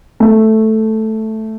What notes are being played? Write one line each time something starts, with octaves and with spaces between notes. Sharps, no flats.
A3